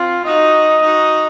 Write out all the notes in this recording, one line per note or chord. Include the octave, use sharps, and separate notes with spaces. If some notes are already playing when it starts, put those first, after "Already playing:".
Already playing: C4 F4
D#4 F#4 D#5
D#4 F#4